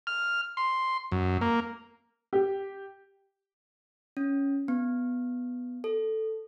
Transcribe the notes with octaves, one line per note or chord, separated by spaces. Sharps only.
F6
C6
F#2
A#3
G4
C#4
B3
A4